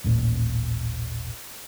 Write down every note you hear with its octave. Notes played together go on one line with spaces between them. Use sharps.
D#1 A1 A#2